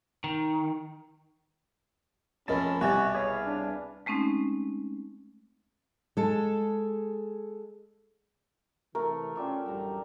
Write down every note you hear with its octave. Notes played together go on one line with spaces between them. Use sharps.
D#3
F2 A3 C#4 A#4 D#5 A5 B5
C2 B2 F#4 G4 G#5 D6 A6
G#4 B4 C#5 F5
D4
G#3 A3 C4 C#4 D#4
G#3 A4
C3 E3 A3 A#4
C#4 F4 G4 D5 E5
A1 F#2 D3 G3 A#5